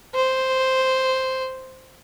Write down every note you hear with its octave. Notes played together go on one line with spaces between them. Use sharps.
C5